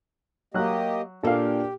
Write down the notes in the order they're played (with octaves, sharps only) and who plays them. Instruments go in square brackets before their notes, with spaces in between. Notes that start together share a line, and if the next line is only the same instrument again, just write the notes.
[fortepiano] F#3 F#6 [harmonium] A#3 G4 D#5
[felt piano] A#2 A#3 [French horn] D4 [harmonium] G4 [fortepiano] A4 F5